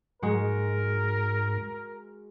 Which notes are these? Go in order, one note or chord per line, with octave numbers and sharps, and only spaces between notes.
G#2 G#3 F#4 A#4